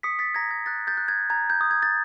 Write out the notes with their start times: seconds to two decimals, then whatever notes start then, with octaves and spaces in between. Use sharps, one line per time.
0.03 D#6 B6 C#7
0.19 A6 B6
0.35 A#5 G#6 A#6
0.51 G#6 A#6
0.66 F#6 G6 A6
0.87 G6 A6
0.97 F#6
1.08 G#6
1.30 A#5 G#6
1.50 G6
1.61 D#6
1.71 G#6
1.83 A6